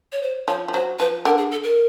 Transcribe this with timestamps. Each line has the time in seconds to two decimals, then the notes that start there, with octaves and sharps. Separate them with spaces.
0.12 C#5
0.22 C5
0.48 F3 C#5
0.68 F3
0.74 F#3 C5
0.99 F3 B4
1.25 D3 A#4
1.38 G#4
1.51 A4
1.64 A#4